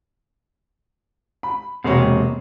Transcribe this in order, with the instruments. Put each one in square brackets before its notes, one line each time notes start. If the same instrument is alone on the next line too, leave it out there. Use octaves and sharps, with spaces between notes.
[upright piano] B5
[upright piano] E1 C#5 [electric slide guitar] C3 G#3 A#3